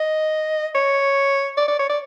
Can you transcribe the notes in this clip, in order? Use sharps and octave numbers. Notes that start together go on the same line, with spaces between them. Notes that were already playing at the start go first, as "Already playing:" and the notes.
Already playing: D#5
C#5
D5
D5
C#5
D5